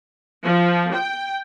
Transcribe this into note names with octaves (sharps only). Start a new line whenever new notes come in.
F3
G5